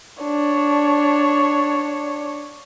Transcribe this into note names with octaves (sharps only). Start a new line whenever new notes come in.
D4 C#5